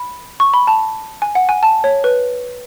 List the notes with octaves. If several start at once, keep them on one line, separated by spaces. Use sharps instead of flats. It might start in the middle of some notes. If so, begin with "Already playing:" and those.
Already playing: B5
C#6
B5
A5
G#5
F#5
G#5
A5
C#5
B4